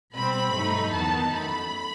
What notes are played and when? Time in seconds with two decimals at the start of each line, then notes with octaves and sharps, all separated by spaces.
0.14 B2 G3 C4 B5
0.54 G2 F#3 A3 D#4
0.93 E2 D#3 F#3 B3 D#4 A5
1.34 F#2 F#3 A3 B5